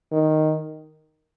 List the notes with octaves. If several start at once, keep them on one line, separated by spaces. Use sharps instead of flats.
D#3